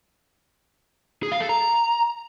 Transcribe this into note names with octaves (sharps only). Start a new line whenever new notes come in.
G#4
F5
A4
A#5